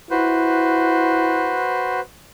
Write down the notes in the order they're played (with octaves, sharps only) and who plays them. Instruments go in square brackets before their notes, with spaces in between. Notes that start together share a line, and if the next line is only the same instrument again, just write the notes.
[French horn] E4 [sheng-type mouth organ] F#4 B4 C5